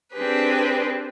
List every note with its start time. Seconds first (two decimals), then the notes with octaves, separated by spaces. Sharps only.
0.13 C4 D4 G4 G#4 B4